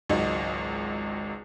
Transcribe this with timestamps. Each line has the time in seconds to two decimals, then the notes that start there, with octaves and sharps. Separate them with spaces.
0.09 G#1 C#2 F#3 D#4